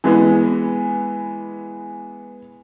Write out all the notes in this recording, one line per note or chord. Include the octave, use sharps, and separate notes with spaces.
E3 G#3 B3